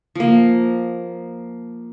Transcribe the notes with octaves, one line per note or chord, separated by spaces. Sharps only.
F3 A#3